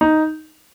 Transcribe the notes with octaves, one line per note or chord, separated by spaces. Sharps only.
D#4